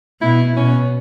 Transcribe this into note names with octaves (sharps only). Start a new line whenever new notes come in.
B2 E4
B2 C#4